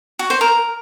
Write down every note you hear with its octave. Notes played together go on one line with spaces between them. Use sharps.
F#4
C5
A#4